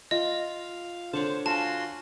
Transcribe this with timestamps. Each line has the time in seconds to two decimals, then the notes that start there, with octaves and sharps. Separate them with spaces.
0.11 F4 D#5 F5
1.13 D3 C5 C#5 F#5 A5
1.46 F4 F#4 G#5 A5 C6